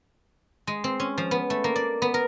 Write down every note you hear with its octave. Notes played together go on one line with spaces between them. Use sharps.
G#3
C4
C#4
F3
B3
A3
A#3
D5
B3
A#4